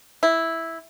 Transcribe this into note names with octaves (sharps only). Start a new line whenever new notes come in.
E4